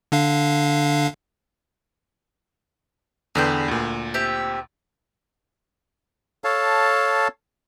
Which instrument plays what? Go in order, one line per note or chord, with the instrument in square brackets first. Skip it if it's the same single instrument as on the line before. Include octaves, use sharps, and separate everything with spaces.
[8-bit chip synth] D3 D4 F5
[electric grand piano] E2 D3 [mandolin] G#4 B4 G5
[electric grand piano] D2 A#2
[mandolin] C4 G4 E5
[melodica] A4 C#5 F5 A5